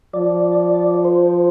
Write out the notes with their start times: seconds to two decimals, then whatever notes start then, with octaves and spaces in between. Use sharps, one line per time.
0.14 F3 D5
1.05 C5